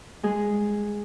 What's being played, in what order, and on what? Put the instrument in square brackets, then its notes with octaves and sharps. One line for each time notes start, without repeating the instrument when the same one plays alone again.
[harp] G#3 G#4